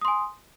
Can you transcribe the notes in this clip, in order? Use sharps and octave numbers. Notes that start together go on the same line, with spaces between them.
G#5 C6 D#6